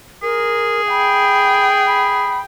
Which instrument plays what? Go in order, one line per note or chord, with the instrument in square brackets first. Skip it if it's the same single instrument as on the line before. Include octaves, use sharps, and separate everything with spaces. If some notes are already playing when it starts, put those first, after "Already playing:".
[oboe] G#4 [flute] A#4
[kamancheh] G5 [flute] B5
[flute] B5